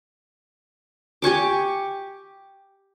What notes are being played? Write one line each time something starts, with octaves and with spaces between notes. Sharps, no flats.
G4 G#5 C#6 D6